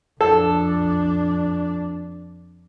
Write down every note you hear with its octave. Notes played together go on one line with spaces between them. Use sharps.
F2 D4 A4